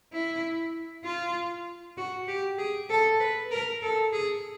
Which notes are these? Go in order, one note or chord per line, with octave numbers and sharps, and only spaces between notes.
E4
F4
F#4
G4
G#4
A4
B4
A#4
A4
G#4